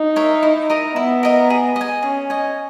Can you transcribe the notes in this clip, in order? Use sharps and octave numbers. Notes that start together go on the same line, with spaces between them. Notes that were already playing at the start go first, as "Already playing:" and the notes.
Already playing: D#4
A#4 C#5 E5
E4
A#4 D#5 A#5
B3 E4
A#4 D#5 A#5
G#4
D#5
G#5
C#4 G#4
D#5 G#5